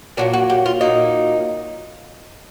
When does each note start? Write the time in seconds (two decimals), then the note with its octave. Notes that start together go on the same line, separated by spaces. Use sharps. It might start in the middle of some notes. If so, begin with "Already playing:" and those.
0.17 A#2 F#3 A#3 D4
0.33 F#4
0.50 G4
0.66 F4
0.81 A#2 F#3 A#3 D#4